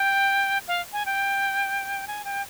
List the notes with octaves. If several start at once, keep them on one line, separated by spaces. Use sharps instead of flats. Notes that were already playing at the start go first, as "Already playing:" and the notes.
Already playing: G5
F5
G#5
G5
G#5
G5